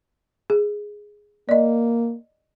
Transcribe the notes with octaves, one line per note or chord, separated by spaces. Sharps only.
G#4
A#3 D5 D#5